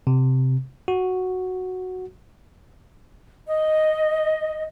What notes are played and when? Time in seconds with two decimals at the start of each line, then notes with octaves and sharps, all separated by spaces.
0.07 C3
0.88 F#4
3.48 D#5